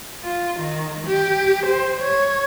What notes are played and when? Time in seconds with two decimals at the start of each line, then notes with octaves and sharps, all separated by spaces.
0.24 F4
0.60 D#3
1.08 G4
1.67 C5
2.02 C#5